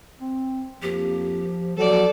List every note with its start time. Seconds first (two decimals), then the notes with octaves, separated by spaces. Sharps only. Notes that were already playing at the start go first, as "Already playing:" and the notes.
0.20 C4
0.82 F2 F3 A#3 G4
1.77 F3 F#3 A4 D5